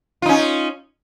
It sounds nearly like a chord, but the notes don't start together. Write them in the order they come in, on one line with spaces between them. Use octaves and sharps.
F4 D#4 C#4